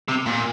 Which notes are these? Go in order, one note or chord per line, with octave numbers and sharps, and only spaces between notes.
C3
A#2